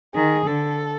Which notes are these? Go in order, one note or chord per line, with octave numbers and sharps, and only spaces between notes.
D#3 G#4
D3 A4